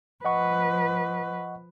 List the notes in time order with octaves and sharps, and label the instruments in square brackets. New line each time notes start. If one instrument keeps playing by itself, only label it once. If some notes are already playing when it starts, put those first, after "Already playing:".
[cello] F3 B4 [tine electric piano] D#5 F#5 C#6